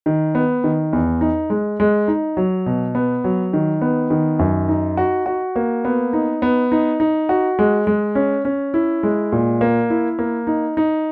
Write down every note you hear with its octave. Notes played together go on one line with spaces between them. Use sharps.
D#3
B3
D#3
E2
D#4
G#3
G#3
D#4
F#3
B2
B3
F#3
D#3
B3
D#3
F#2
D#4
F#4
F#4
A#3
B3
D#4
B3
D#4
D#4
F#4
G#3
G#3
C#4
C#4
E4
G#3
A#2
A#3
E4
A#3
D#4
D#4